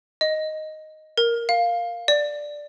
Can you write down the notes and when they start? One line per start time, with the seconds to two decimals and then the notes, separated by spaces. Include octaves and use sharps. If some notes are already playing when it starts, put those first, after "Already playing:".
0.21 D#5
1.18 A#4
1.49 F5
2.08 D5